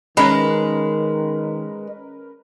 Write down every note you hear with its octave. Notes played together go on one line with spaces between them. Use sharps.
D#3 G#3 C#4 A#4 B4 B5